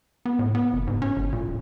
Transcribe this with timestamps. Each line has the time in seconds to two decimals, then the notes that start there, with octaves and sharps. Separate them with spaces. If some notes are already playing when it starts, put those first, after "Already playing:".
0.25 B3
0.39 A2
0.55 B3
0.73 F#1
0.87 G#2
1.02 C#4
1.16 G1
1.33 A#2
1.47 D#1